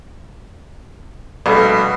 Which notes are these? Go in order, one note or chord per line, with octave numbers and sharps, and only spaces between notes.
A#1 B2 G3 A3